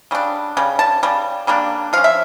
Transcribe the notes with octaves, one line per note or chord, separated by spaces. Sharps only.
C#3 G3 D4
C#3 G3
A5
C#3 G3
C#3 G3 A#3 D4
F3 C#4 F5
E5